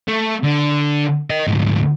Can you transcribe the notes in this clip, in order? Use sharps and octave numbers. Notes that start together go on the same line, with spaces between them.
A3
D3
A#4 D#5
D2 G#2